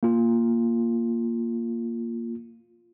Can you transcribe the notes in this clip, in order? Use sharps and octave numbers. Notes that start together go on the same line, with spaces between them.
A#3 F4